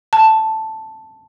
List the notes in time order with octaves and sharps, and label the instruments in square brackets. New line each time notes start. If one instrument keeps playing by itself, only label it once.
[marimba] A5